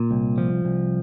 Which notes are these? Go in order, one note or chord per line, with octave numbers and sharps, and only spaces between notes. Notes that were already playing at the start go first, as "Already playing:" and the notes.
Already playing: A#2
C2
F3
C2